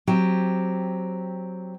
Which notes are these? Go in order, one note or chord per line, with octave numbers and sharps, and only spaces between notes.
F#3 C4 G4